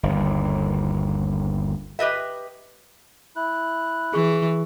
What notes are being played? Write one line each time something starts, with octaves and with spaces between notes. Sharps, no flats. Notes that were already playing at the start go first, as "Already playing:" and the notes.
G1 D#2
G4 B4 D#5 E5
E4 F#6
E3 G#4 C#6